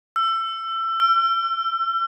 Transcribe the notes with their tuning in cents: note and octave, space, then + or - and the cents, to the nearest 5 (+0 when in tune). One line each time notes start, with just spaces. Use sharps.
E6 +25
E6 +45